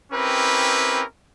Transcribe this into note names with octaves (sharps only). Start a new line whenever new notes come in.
C4 C#4 E4 G4 A#4 B4